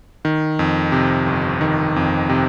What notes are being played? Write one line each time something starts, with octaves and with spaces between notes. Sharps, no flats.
D#3
F2
C3
G1
D#3
F2
C3